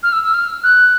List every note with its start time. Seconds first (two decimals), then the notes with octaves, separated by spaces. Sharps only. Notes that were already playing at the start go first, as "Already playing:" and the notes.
0.03 F6
0.13 E6
0.24 E6
0.34 F6
0.64 F#6